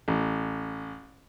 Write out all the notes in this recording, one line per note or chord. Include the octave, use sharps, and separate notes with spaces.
A1